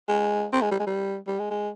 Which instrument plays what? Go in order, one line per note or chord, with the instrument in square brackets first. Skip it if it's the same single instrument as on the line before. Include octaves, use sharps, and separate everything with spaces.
[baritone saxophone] G#3
C4
G#3
G3
G#3
G3
G3
G#3
G#3